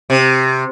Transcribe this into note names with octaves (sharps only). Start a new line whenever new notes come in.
C3